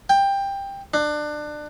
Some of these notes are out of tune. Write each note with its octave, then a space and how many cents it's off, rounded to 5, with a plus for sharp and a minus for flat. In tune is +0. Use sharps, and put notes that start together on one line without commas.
G5 +15
D4 +25